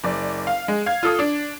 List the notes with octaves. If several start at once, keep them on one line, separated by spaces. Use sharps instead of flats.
F#1 D5
F5
G#3
F5 G#6
F4 A4 D#6
D4